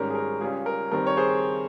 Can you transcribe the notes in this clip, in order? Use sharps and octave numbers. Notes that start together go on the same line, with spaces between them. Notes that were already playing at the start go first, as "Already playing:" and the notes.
Already playing: G#1 G#2 G3 C#4 A#4
G#4
A#4
C#2 C#3 G3 C#4 G#4
A#4
G2 D#3 G3 C4 A#4
C#5
G#4 C5